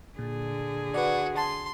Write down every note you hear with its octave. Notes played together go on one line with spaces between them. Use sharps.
A#2 D3 G#4
F#4 B4 D5
A5 C6